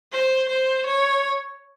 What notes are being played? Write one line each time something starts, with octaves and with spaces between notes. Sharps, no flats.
C5
C5
C#5